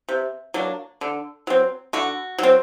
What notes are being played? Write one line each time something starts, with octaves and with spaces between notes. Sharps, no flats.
C3
F#3 A#3 D4
D3
F#3 C4
D3 F#4
F#3 C4